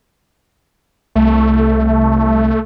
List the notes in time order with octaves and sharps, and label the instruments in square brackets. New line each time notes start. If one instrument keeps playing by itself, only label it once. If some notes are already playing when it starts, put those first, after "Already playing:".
[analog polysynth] C2 [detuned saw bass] A3